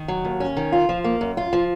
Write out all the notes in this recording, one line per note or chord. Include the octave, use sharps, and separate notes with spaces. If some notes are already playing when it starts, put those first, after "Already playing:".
Already playing: D#3
F#3
D#2
C#4
D#3
F4
F3
A#3
F#2
F4
F3